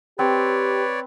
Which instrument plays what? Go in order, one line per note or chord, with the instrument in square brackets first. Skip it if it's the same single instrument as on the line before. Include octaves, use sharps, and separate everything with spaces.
[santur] C4 [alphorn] G4 [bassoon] B4 [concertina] C#5 D5